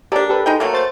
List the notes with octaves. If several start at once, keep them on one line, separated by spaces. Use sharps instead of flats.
A#3 D4 G4 A4 D5
G4 A4 B4
G#3 D#4 G5
F#3 A3 A#3
C5 A6